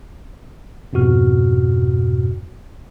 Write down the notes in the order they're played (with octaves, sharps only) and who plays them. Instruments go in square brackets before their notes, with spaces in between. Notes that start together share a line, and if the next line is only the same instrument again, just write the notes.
[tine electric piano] F2 G#2 B2 F#4 F6